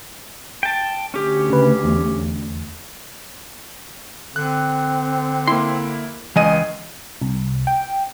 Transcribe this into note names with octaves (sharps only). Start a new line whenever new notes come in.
G5 A5
D2 C#4 G4
C#3 B4
E2
D3 C4 F#6
A#3 E4 C6
C#2 E3 D#5 G#5 D#7
C2
G5